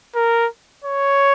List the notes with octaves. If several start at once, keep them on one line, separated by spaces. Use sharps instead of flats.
A#4
C#5